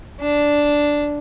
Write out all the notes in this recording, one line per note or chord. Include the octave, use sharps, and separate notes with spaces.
D4